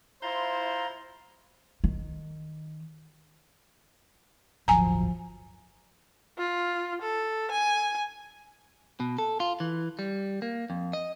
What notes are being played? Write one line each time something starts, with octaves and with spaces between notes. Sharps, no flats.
E4 F4 C5 A#5
D#3
D1 G1 F3 F#3 G#5 A#5
F4
A4
G#5
B2
A4
F4
E3
G3
A#3
F2
D#5